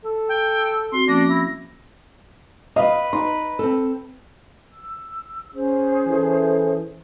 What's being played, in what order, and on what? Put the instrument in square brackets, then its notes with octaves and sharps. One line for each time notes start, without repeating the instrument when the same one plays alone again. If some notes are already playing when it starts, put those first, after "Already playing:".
[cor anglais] A4
[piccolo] G5
[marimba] C4 F#4 [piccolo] C6
[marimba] F3 A#3 C#4 [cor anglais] D4 [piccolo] A#6
[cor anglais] E4
[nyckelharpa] B4 [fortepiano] D#5 F5 D#6
[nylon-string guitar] D#4 [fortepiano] C6
[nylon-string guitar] C4 A4
[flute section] E6
C#4 G#4 C5
[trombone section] E3 E4 A4